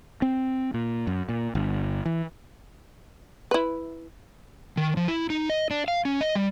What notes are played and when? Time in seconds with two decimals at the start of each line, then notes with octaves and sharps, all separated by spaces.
0.22 C4
0.74 A#2
1.07 F#2
1.29 A#2
1.55 G1
2.06 E3
3.51 E4 B4
4.77 D#3
4.97 F3
5.08 E4
5.30 D#4
5.50 D#5
5.71 D4
5.88 F5
6.05 C#4
6.21 D#5
6.35 G3